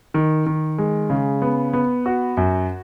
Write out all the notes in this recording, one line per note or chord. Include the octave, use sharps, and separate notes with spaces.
D#3
D#3
G#3
C#3
B3
B3
F#4
F#2